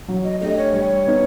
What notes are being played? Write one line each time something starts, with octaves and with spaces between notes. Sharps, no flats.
F#3
D#5
A3 D4 G4 D#5
C#5
G3 C#5
B3 D#4